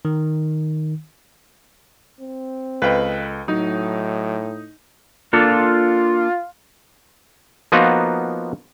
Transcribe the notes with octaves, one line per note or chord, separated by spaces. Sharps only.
D#3
C4
C#2 A4 B4 D#5 F5 G5
A2 F#3 D#4
A#3 D4 F4 A4
F3 A#3 B3 D#4 F4 F#4